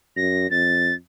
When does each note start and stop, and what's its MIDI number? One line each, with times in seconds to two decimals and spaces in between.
0.17 0.50 42
0.17 0.50 94
0.51 0.92 41
0.51 0.94 93